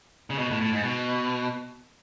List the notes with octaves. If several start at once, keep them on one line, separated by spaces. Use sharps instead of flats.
C#3
B2
A2
A2
G#2
B2